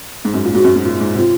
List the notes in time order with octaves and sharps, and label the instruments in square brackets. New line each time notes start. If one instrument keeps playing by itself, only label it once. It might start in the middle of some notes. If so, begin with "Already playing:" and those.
[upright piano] G#2
F#2
A#2
[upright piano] G#2 [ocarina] F#4
[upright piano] F#2
G#2
A#2
G#2
[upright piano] C3 [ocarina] F4